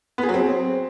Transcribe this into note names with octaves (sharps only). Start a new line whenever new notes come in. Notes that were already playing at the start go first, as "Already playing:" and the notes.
B3
G#4
F#3
C4